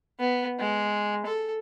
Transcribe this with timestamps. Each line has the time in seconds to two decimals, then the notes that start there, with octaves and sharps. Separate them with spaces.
0.20 B3
0.59 G#3
1.26 A4